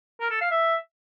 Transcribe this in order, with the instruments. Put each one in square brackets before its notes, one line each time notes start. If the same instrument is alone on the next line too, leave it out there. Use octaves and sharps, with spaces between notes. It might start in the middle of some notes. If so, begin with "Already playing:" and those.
[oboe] A#4
A4
F5
E5